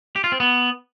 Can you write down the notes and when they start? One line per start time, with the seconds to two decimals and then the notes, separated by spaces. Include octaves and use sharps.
0.16 G4
0.24 F4
0.32 C4
0.40 B3